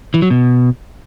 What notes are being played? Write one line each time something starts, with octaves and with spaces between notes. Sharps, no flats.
E3
F#3
B2